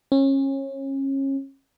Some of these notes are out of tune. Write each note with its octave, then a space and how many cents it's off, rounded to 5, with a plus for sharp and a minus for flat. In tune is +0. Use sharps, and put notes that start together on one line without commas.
C#4 -30